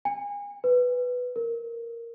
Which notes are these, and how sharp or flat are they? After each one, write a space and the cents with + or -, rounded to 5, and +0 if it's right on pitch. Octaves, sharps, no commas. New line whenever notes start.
G#5 -35
B4 +5
A#4 -5